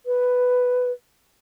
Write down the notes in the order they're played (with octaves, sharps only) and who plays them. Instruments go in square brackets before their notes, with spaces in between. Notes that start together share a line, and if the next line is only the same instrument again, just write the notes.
[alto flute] B4